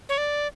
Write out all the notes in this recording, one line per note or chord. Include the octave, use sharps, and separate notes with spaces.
C#5
D5